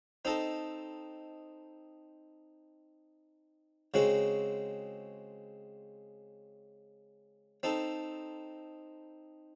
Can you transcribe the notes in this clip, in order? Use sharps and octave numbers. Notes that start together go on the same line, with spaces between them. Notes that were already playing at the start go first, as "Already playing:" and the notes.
C4 D#4 A4 D#5
C#3 G#3 C4 F#4
C4 D#4 A4